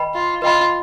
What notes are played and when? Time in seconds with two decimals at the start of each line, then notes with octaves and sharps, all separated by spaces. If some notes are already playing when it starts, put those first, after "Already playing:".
Already playing: B4 D#5 G5 B5
0.14 F4
0.42 F4 B4 D#5 G5 B5